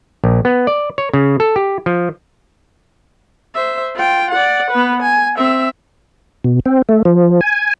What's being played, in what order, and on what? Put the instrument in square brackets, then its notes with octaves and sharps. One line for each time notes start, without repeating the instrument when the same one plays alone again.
[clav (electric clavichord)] A#1
B3
D5
C#5
C#3
A4
G4
F3
[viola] C5 E5
F4 G5
D5 F#5
B3 B4
G#5
C4 E5
[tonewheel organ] B2
C4
A3
F3
G#5